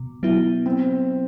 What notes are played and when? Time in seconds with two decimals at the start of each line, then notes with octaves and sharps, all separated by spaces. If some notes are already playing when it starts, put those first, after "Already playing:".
Already playing: B2
0.23 F#3 B3 E4
0.66 C4